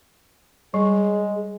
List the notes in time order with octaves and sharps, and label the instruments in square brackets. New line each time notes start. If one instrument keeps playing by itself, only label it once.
[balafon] G3 [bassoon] G#3 [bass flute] G#4